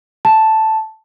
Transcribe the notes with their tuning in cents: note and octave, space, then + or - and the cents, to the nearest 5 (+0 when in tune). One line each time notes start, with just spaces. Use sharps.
A5 +0